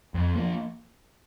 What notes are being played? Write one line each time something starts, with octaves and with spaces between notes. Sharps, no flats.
F2
F3 A#3